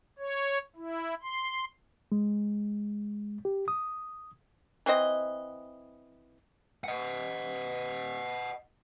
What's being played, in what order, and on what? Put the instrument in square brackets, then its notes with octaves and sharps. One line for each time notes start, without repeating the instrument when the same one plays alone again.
[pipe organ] C#5
E4
C6
[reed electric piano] G#3
G4
D#6
[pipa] E3 C4 C5 D#5
[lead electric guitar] D#5 F#5